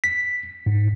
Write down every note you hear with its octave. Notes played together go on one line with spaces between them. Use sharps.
B6
G#2